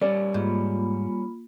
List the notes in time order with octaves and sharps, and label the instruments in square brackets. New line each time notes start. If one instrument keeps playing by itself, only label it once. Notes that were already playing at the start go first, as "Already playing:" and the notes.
[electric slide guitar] G3 C#4 [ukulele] D5
[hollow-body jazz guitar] G#2 [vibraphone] A#3 F4 B5